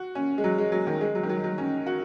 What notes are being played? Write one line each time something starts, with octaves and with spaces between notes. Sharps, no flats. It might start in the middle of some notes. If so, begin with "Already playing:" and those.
Already playing: F#4
C#4
G#3
F#3
G#3
F#3
D#3
G#3
F#3
D#3
F#3
F#3
C#4
F#4